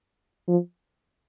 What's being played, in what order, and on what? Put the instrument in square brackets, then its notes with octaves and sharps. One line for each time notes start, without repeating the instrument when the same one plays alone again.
[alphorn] F3